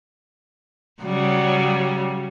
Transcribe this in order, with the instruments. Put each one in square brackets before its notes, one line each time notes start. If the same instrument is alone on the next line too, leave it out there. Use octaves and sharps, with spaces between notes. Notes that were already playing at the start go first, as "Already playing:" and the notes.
[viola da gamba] C#3 F#3 G3